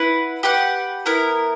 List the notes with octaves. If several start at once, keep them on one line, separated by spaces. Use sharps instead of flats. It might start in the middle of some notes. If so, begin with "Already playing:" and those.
Already playing: E4 B4 F#5
G4 B4 F#5
B3 E4 A#4